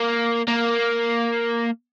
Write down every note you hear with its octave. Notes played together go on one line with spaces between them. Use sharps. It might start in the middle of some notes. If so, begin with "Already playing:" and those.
Already playing: A#3
A#3